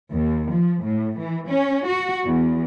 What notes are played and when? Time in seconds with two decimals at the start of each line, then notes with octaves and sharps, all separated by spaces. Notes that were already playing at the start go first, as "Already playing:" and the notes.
0.12 D#2
0.50 F3
0.84 A2
1.19 E3
1.48 C#4
1.86 F#4
2.26 E2